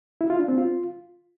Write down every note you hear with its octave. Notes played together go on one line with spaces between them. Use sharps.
E4
F4
D4
C4
F4